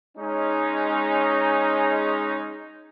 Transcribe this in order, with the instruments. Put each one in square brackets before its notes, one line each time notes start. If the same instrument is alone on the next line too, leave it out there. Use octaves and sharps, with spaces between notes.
[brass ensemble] G#3 C#4 D#4